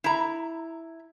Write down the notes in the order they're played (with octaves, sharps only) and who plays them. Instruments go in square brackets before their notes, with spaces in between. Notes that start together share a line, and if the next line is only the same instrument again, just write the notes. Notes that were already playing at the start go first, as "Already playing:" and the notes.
[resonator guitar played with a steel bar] E4 A#5